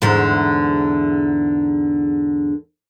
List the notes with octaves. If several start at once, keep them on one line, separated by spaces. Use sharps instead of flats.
E2 G#2 D3